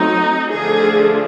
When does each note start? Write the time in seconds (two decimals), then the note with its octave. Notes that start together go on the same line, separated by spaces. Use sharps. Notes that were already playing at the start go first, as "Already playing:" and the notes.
Already playing: F#3 A3 C4 D#4
0.51 D3 F3 A3 D4 G#4